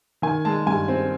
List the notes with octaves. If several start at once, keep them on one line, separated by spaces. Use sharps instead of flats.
D#3 G#5
G#3 A5
G2 G#5
C4